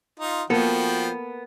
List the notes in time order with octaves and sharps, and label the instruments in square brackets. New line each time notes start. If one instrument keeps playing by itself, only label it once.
[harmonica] D#4 F4
[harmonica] F3 F#4 G5 [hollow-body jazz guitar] A#3 B3 A4